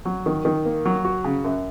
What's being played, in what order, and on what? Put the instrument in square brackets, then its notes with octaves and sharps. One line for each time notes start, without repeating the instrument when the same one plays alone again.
[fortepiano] F#3
D#3
D#3
A#3
F#3
F#4
C#3
F#2